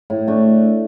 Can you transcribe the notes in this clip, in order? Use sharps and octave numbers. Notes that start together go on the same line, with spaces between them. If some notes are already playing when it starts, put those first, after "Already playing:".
A2
A3 D4